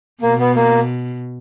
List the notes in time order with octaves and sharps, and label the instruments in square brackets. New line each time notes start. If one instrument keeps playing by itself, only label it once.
[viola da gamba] B2 [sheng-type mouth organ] A#3
[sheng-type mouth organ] B3
A#3